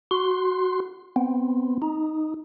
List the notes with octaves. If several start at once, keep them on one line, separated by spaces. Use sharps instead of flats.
F#4 C6
B3 C4
D#4